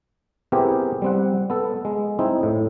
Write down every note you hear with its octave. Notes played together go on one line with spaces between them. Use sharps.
B3 C4 E4 G4 G#4 A#4
G3 C4 F#5
B3 A4
G#3
C4 D#4 E4
A2